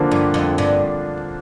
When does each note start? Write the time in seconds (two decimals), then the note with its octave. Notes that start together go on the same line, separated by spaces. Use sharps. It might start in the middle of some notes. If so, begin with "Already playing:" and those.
Already playing: D3 F3 A#3 D4
0.11 G2
0.34 F2
0.58 G2